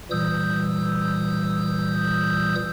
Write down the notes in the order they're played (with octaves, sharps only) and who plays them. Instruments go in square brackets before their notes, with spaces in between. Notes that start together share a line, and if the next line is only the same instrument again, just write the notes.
[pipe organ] A#2 E3 G3 D#6 E6 G6